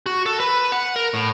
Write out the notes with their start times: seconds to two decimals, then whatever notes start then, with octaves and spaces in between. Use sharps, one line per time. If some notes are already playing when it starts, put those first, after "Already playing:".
0.06 F#4
0.26 A4
0.40 B4
0.72 F#5
0.96 A#4
1.14 A2